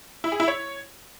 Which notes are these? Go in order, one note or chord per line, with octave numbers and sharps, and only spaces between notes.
E4
G#4
E4
C#5